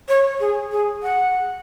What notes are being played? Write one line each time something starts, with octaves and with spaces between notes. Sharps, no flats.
C#5
G#4
G#4
F#5